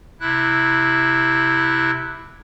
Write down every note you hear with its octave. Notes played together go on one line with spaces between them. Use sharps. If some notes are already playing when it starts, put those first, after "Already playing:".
C3 E4 F#6